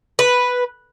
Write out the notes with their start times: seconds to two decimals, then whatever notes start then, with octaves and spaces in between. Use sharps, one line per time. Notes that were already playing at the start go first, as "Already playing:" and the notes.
0.19 B4